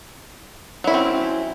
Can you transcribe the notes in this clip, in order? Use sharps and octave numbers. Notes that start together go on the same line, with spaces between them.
F#3 C4 C#4 E4